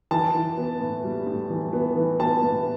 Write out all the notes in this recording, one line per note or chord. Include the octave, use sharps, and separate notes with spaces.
E3 A5
E3
B3
A2
G3
A2
E3
B3
E3
B3 A5
A2